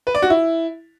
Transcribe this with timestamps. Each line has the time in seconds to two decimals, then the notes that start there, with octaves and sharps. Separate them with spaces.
0.07 B4
0.15 D5
0.22 F#4
0.30 E4